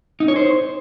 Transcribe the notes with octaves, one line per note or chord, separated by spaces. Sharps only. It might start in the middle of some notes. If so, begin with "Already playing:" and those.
D#4
C#5
C5